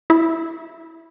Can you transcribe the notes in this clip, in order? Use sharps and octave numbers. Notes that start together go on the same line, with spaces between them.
E4